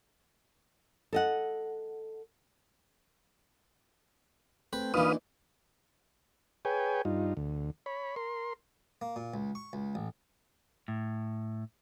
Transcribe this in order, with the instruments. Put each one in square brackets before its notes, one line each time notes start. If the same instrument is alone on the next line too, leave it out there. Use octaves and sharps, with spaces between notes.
[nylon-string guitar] A4 D#5 F#5
[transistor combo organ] A3 C4 G5 [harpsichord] B4
[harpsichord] A#2 E3 [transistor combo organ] D4 D#4 [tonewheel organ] B4 F5 D#6
[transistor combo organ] G#4 B4 C#5 G5 G#5
G2 D#4 F4
D2
C#5 B5
A#4 C6
[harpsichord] A#3
A#2
C#2
C#6
C#2
A1
[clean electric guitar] A2